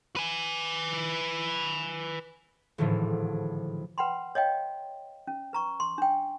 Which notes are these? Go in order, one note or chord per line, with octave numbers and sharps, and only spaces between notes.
B4 G#5
G#1 A2 D3 E3 F3
B4 F#5 G5 B5 C6
C#5 D#5 F5 G5
C#4
B4 A#5 C#6
C6
D4 G5